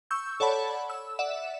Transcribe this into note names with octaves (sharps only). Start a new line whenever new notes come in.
C#6 E6 G6
A4 C#5 D5 F#5 A5 B5
E6
D5 E5 F#5 E7